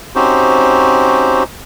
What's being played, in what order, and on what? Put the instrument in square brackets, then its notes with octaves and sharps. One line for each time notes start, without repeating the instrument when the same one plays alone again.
[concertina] C4 C#4 D#4 F#4 G4 C5